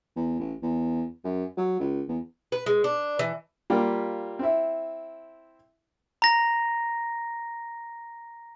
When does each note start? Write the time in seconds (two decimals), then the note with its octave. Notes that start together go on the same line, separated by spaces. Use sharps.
0.16 E2
0.39 A1
0.62 E2
1.24 F#2
1.57 F#3
1.80 C#2
2.08 E2
2.52 B4
2.66 G#3
2.84 D4
3.19 E3
3.70 G3 A#3 F4 G4
4.39 C4 E4
6.22 A#5 A#6